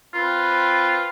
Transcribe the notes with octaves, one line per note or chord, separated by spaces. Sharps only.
C4 F4 B4